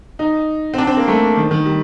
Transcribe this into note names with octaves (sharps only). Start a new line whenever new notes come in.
D#4
C4
D4
C4
A#3
A3
D#3
D#3
G3